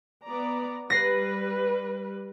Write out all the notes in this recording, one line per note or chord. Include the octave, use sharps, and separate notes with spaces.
B3 D5 A#5
G3 B4 A#6 C7